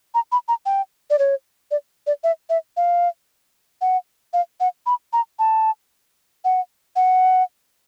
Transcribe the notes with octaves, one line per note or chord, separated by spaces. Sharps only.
A#5
B5
A#5
G5
D5
C#5
D5
D5
E5
E5
F5
F#5
F5
F#5
B5
A#5
A5
F#5
F#5